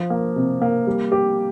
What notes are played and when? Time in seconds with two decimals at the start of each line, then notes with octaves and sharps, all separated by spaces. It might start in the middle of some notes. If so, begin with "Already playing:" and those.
Already playing: F3
0.10 A#3
0.36 C3
0.62 A#3
0.87 G3
1.12 G4